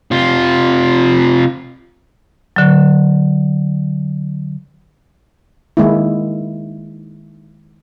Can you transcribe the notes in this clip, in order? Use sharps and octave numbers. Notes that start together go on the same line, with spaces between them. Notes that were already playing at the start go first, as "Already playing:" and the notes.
C3 F4
D3 F#3
D#3 G#3 A#3 E4